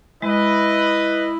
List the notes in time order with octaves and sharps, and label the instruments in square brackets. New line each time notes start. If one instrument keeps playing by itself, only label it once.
[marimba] G#3 [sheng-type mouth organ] E4 [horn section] B4 D#5